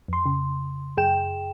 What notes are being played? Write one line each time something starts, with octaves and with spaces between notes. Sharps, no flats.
F2 C6
C#3
F#2 G#4 G5 E7